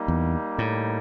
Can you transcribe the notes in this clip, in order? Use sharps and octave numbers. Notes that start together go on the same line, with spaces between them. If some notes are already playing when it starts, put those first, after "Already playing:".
Already playing: G3 A#3 D#4
E2
A2